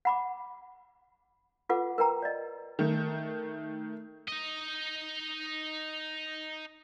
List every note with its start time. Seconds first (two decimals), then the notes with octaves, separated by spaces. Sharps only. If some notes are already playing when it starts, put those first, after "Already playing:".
0.05 F#5 B5 D6
1.69 F4 A4 B4 F#5 D6
1.98 A#4 B4 G5 A#5
2.22 D5 D#5
2.79 D#3 A3
4.28 D#4 D#5